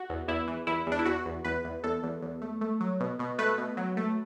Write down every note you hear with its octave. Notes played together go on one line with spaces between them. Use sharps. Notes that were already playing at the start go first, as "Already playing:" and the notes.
Already playing: F#4
E2
E2 E4
E3
E2 E4
E2 D4
E4
E2 F#4
E2
E2 B4
E2
E2 A4
E2
E2
A3
A3
F#3
B2
B2
A3 B4
B2
F#3
A3